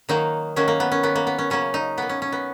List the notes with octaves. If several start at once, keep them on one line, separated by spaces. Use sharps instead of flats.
D#3 F#3 A#3 D#4
D#3 F#3 A#3 C#4
A#3
B3
C#4
D#3 A#3 B3
A#3
B3
C#4
C#3 F#3 A#3 C#4
D#4
B2 A#3 B3
C#4
C#4
B3